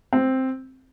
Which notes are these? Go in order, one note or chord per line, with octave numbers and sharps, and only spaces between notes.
C4